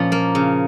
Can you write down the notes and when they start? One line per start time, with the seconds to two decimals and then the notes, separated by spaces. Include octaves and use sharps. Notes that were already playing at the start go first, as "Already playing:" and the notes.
Already playing: A#2 F3 C#4
0.12 A#3
0.35 C#3